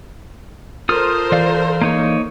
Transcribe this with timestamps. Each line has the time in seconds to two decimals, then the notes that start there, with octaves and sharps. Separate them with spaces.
0.89 F4 A4 A#4 C5 D#6 F6
1.32 E3 D5 F5
1.82 A#3 D#4 C#5